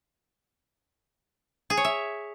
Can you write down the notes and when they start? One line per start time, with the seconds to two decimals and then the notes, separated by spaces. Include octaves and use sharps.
1.70 G#4
1.77 C#5
1.85 E5